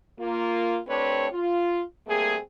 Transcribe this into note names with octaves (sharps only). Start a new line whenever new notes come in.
A#3 F4
A3 C4 D4 G4 B4 C#5
F4
G3 A3 A#3 C4 G#4